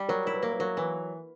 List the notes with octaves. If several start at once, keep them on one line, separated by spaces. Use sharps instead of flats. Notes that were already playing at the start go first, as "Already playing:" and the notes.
Already playing: G3
F#3 A#4
E4 A#4
B4
A#3 A#4
B4
F#3 A#4
E3 B4